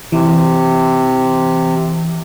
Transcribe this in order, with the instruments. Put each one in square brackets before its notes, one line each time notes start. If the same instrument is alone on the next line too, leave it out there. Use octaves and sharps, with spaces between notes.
[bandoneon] C3 [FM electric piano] E3